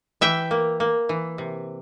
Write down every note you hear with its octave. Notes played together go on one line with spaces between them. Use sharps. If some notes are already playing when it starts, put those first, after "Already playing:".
E3 E5 G5
A#3
A#3
E3
C3